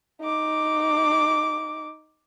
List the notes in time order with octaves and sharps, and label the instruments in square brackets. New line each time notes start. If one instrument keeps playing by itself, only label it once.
[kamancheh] D#4 D6